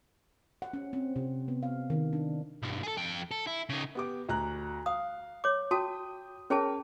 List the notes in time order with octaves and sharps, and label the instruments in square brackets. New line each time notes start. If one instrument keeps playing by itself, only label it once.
[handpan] F#5
C#4
C4
C3
B3
F5
D#3
D4
[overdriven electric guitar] B1 G2
G#4 A4
F2 G5
A4
E4
C#3 D#4
[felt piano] B3 G4 D6
D2 A#5 F#6
[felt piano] F5 [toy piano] D#6
[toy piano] C#5 D6
[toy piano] F#4 A5 [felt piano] G5 D#6
[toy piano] C#4 G#4 A5 [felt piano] A#4 C#5 G5